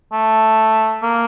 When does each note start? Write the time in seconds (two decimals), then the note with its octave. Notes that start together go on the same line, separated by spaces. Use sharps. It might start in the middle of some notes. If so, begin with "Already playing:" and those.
0.12 A3
1.02 A#3